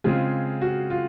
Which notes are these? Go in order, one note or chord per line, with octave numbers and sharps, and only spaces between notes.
C#3 G#3 C4 F4 G#4
F#4
F4